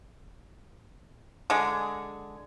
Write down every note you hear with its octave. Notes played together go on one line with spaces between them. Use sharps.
D3 G#3 G#4